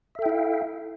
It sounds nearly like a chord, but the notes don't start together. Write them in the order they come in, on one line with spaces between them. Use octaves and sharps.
E5 A4 G5 E4 F5